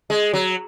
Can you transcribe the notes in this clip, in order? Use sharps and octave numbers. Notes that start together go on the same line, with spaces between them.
G#3
F#3